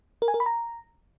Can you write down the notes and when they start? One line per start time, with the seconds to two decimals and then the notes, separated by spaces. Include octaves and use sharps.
0.22 A#4
0.28 G#5
0.34 A#4
0.40 B5
0.46 A#5